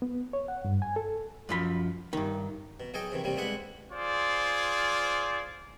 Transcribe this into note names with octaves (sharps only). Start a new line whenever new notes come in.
B3
C#5
F#5
G2
G#5
A4
F#2 F3 B5
G2 D#3
B2
B1 G#4 A4 D#5 G5
C3 D#3 E3
D#2 C3 G3 A3
C2 G#3 D4 E4 B4 F#5
F4 G#4 C5 D5